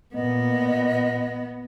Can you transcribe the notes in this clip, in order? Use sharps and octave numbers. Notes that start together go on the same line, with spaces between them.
A#2 B3 D#5